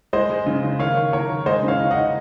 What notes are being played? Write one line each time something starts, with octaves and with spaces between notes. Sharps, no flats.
G#3 C5 D#5
G#3
C#3
C#3
D#3 C#5 F5
D#3
A#3 A#4 C#5
D#3
G#3 C5 D#5
C#3
C#5 F5
D#4
D#5 F#5
D#4